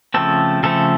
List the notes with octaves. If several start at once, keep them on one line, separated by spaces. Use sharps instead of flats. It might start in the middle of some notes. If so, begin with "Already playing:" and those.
C#3 F3 A3 C4 A4
C#3 F3 A3 C4 A4